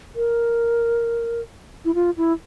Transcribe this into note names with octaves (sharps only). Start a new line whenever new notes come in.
A#4
E4
F4
E4